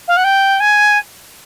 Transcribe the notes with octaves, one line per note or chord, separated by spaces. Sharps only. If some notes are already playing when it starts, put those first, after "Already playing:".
F5
F#5
G5
G#5